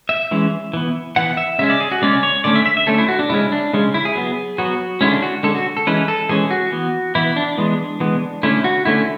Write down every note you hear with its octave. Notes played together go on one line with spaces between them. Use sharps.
E5
E3 G#3 C#4
E3 B3
E3 B3 F#5
E5
C#3 G#3 C#4 E5
D5
G#4
F#4
C#3 G#3 C#4 D5
C#5
D3 A3 C#4 D5
E5
E5
E5
D3 A3 C#4 A4
E4
F#4
D4
C#3 G#3 C#4 E4
D4
C#3 G#3 C#4
E4
G#4
F#3 B3
F#3 B3 F#4
D3 G#3 C#4 E4
D4
F#4
D3 G#3 C#4 A4
F#4
A4
E3 G#3 C#4 B4
A4
E3 G#3 C#4 G#4
F#4
E3 B3
E3 B3 E4
D4
E3 G#3 B3
E3 G#3 B3
D3 A3 C#4 E4
F#4
D3 A3 C#4 E4